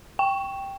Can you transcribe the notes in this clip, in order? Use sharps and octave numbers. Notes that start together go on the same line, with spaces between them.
G5